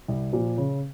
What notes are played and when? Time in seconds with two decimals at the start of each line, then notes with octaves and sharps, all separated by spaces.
0.08 C2
0.33 A#2 F3
0.58 C#3